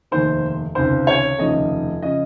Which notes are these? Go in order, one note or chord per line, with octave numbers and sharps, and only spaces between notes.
F1 D#2 D#3 C5
C#2 C3 D#3 C5
C#5
F1 D#2 C#3 F3 D#5
C#3 F3 D#5